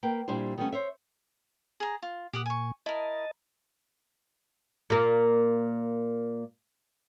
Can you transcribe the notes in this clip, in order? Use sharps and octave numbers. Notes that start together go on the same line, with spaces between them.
A#3 B4 G5
A#2 G3 D4 E4 G4 C5
D#3 G3 A3 B3 C#4
C5 C#5 E5
G#4 A#5
F4
A#2 G4 F#5 D#6
G#5 C#6
E4 A#4 D#5 A5
A#2 A#3